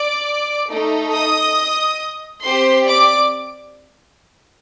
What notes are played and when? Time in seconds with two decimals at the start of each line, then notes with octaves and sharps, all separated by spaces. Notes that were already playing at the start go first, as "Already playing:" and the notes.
Already playing: D5 D6
0.70 A3 D#4 A4
1.12 D#5 D#6
2.43 C4 G4 C5 C6
2.86 D5 D6